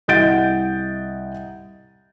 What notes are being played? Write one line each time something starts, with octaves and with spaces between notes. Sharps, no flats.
C2 D#5 F#5 G6 A6 D7